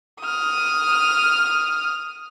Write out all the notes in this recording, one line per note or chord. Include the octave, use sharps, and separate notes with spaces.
D#6 F6